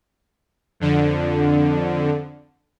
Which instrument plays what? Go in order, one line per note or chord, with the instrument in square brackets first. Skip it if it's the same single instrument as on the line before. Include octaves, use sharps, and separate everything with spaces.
[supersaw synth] F2 D3